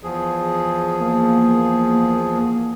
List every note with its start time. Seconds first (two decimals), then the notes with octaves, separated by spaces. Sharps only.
0.03 E2 F3 G#4
1.00 A#3